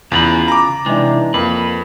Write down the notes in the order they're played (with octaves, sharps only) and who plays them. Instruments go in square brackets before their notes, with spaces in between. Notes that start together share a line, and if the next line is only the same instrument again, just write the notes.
[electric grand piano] E2 [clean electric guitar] C#3 F4 B5
[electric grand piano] A#5 D6
[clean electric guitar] C3 G#3 [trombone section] E3 D4 D#4
[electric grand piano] F2 [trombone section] A#3 [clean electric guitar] B4